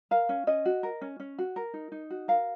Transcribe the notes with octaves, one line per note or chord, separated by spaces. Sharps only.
A#4 F5
C#4
C#4 D#5
F#4
A#4
C#4
C#4
F#4
A#4
D#4
D#4
F#4
A#4 F5